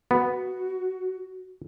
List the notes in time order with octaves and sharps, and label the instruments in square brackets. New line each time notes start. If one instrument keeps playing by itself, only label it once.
[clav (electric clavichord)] B3 [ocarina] F#4